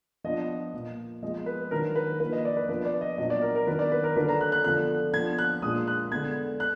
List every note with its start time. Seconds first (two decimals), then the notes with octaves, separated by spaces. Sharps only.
0.24 F3 B3 D4 D#5
0.73 A#2 F3 A#3
1.23 F3 G#3 B3 D#5
1.46 B4
1.71 D#3 F#3 D4 A#4
1.96 B4
2.20 F3 A#3 D4 B4
2.32 D#5
2.45 D5
2.57 B4
2.69 F3 B3 D4 B4
2.85 D5
3.01 D#5
3.18 A#2 F#3 B3 D4 D#5
3.30 D5
3.42 A#4
3.55 A#4
3.67 D#3 F#3 B3 D4 B4
3.79 D5
3.92 B4
4.04 A#4
4.16 D3 F#3 D4 B4
4.29 A#5
4.41 F#6
4.52 F#6
4.64 D3 F3 B3 D4 F#6
5.14 F3 B3 D4 G#6
5.38 F#6
5.62 A#2 G#3 D4 D#6
5.87 F#6
6.11 D3 G#3 B3 G#6
6.60 F#6